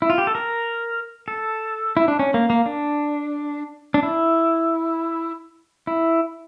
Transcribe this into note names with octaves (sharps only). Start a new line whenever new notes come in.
E4
F4
G4
A4
A#4
A4
E4
D4
C#4
A#3
A#3
D4
D4
E4
E4